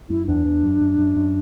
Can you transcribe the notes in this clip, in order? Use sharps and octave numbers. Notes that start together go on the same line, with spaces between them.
F#2 E4
E2 D4
E2
F#2
F#2
F#2
F#2